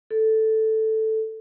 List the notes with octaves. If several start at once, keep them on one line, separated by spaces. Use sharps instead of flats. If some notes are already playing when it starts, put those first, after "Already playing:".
A4